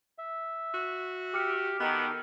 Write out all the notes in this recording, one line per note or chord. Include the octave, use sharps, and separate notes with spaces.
E5
F#4
G4 D6 F6 C#7
D#3 B3 D#4 G4 A4